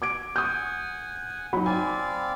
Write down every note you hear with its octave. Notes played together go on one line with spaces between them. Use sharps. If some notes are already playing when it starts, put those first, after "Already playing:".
D6 G#6 D7
F#5 G#5 D#6 G6
F#3 D#4 B5
C4 D5 F5 G#5